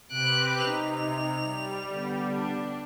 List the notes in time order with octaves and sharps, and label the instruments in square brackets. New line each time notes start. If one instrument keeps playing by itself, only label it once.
[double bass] C3 [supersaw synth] C4 G4 B4 [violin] F#6 D7
[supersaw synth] C3 [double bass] D#4 [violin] F7
[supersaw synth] G3
[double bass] D3 B3
[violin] D4